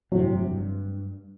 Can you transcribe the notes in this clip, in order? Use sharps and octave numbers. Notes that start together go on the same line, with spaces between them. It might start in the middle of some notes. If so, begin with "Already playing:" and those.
G1 F2 A2 C3 F#3
G2